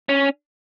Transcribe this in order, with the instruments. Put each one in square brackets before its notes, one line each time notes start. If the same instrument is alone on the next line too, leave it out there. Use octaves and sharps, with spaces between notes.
[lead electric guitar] C#4